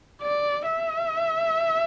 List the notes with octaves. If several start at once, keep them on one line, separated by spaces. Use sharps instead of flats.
D5
E5